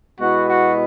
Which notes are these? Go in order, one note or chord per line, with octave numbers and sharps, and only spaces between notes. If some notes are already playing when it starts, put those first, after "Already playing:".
B2 G#3 B3 E4 F#4
F#4